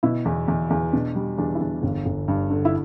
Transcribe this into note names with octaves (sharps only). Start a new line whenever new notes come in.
B2 E4
E2
E2
E2
B2 D4
G3
E2 D4
E4
E2 D4
G1
G1
G2
D3
E4